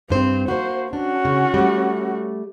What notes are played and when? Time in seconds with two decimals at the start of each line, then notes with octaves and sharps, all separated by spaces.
0.10 G2 C4 C5
0.48 A#3 F#4 C5
0.93 C#4 D4 F#4
1.25 C#3
1.54 G3 A3